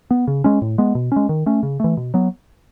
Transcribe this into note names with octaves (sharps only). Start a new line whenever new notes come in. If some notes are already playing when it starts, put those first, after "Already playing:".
B3
C#3
G#3 C#4
A2
G#3 B3
B2
G#3 C#4
D#3
A3 C#4
C#3
E3 A3
B2
F#3 B3